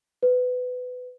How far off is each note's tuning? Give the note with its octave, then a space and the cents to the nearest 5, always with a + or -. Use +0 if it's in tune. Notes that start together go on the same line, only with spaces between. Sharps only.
B4 +20